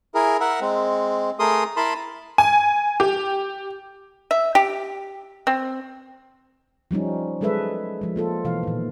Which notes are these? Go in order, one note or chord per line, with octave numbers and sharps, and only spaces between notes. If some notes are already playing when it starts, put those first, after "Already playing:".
E4 G#4 A#4
A#4 E5 F#5
G#3 C4
A3 G#4 A#4 C6 D#6
E4 A#4 A5 B5 C6
G#5
G4
E5
G4
C4
F3 G3 C#4 D#4
F#3 G#3 G#4 A4 B4 E5
F3 G#3
A#3 F4 A4
B2 E3 F5
A#2 D#3